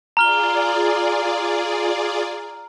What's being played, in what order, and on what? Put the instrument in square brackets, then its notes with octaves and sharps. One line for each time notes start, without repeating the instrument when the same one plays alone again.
[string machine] F4 G#4 D5 [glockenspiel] A#5 F6 G7